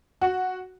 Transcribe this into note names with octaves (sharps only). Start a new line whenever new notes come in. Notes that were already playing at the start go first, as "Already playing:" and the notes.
F#4